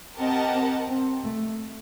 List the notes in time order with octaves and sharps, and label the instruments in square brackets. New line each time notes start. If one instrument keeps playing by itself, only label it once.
[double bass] C4 [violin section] G4 A#4 D#5 F#5 A5
[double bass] C4
C4
A3